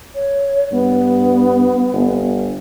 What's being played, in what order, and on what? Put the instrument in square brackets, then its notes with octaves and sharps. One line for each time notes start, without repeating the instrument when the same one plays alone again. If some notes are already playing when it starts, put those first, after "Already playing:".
[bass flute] C#5
[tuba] G2 [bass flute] B3
[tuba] G1